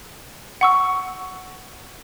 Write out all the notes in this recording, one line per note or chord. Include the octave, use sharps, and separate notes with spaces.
F#5 C#6 E6